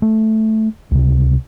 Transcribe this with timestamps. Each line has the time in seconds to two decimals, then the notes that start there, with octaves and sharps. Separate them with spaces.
0.02 A3
0.91 C#2 C3